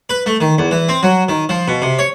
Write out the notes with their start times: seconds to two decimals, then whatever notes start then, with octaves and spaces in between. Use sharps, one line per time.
0.10 B4
0.26 A3
0.40 D#3
0.58 E2
0.71 E3
0.89 C4
1.03 F#3
1.29 D#3
1.49 F3
1.68 B2
1.82 C3
1.99 C#5